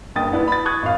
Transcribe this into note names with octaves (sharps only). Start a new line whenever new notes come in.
F#1 G2 G5 D#6 A6
B3 D4 E4 B4
B5 A6
C#6 D#6 F#6 G#6
G#1 F5